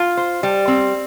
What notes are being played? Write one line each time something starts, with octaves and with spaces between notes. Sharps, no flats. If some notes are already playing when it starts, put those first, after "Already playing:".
Already playing: F4
C5
G3
C4